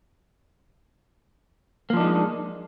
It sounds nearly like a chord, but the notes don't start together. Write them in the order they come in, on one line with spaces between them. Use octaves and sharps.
A#3 F3 D4 D#4 G#3